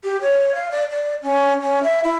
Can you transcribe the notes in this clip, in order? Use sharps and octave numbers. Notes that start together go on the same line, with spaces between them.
G4
C#5
F5
D5
D5
C#4
C#4
E5
E4